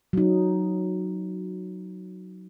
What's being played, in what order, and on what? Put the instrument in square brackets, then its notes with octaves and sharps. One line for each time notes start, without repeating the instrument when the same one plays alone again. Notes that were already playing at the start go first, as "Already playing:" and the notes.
[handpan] F#3 D#4